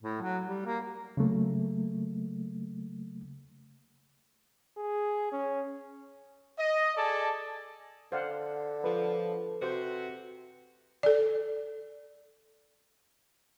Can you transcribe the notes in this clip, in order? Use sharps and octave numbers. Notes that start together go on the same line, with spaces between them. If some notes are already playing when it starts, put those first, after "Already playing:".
A2
F#3
G3
A#3
C#3 F#3 A3 A#3
G#4
C#4
D#5
G#4 A4 D5 A5
D3 C5 F5 F#5
F3 A4 B4
C3 F#4 C5
A4 D5